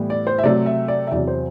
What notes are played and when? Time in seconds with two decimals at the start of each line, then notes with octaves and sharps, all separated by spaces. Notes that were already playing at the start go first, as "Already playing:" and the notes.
Already playing: A2 E3 G3 B3
0.10 D5
0.27 C5
0.38 E5
0.43 C3 F#3 A3 D5
0.66 E5
0.88 D5
1.07 E5
1.11 E2 C3 F#3 D5
1.27 C5